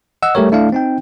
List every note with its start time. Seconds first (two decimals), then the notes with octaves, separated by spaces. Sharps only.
0.22 D#5 F#5 E6
0.35 G3 A3 G4 A#4 C#5
0.52 A3 D4 E4 F5
0.72 C4 D#4 G5